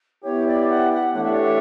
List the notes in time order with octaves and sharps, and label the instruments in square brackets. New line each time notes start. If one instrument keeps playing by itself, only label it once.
[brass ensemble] B3 E4 G4 [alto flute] C#5
[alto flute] D5
F#5
F#5
[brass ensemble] E3 A3 D4 G4 C#5 [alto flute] F#5
[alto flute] E5
D5
E5